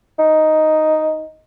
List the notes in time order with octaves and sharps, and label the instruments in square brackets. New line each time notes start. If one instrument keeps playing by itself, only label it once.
[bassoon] D#4